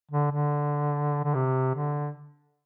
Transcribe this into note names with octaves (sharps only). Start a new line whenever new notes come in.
D3
D3
D3
C3
D3